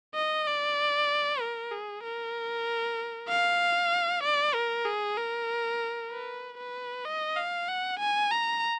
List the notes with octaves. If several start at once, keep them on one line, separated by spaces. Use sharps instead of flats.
D#5
D5
A#4
G#4
A#4
F5
D5
A#4
G#4
A#4
B4
B4
D#5
F5
F#5
G#5
A#5